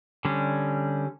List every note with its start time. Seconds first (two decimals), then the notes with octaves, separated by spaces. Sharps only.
0.25 D3 G3 C#4